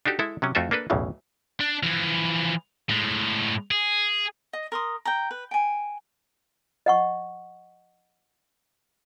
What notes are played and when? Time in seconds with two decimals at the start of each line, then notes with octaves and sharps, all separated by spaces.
0.06 D4 D#4 F#4 G4 A4
0.19 G#3 E4 A4 E5
0.42 C3 F#3 C#4
0.55 F2 A3 F4 F#4 A4 E5
0.71 A#3 D4 A4 B4
0.90 B1 E2 A2 C#3 E3
1.61 D4
1.83 E3 F3
2.90 A2 G#3
3.71 G#4
4.53 D#5
4.72 A#4 C6 D#6
5.05 G5 A#5
5.31 B4
5.51 G5 G#5
6.86 D#5 F#5 C#6